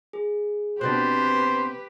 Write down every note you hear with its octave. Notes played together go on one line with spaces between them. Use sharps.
G#4
B2 C4 D4 G4 B4 C5 F#6 A6